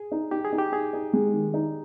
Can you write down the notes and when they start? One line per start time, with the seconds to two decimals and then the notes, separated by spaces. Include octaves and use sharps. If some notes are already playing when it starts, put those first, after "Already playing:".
Already playing: G#4
0.12 D#4
0.31 D#4 G4
0.45 G#4
0.52 D#4
0.59 G4
0.72 D#4 G#4
0.93 D#4
1.13 G#3
1.33 D#3
1.54 D#4